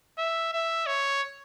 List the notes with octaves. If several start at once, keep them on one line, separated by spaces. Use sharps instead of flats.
E5
E5
C#5